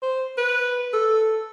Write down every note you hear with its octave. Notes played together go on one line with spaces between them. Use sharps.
C5
B4
A4